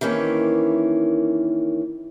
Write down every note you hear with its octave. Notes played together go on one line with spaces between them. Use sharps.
D#3 E3 A#3 C#4